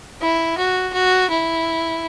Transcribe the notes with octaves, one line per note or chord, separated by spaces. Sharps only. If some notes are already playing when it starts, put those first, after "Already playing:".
E4
F#4
F#4
E4